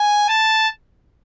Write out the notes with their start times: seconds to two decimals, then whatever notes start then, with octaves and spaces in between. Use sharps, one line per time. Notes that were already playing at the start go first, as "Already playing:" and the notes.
Already playing: G#5
0.29 A5